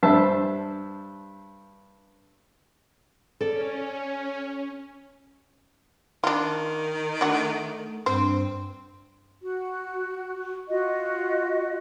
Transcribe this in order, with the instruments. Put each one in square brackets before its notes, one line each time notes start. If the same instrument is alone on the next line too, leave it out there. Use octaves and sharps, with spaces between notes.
[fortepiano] G2 C5 E5 A5 E6
[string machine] C#4 [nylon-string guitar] A4 D5
[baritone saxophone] D#3 [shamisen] D4 F4
[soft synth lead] A3 [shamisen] D4 F#4
[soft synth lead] G2 [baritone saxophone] C4 [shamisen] C5
[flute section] F#4
F4 F#4 D#5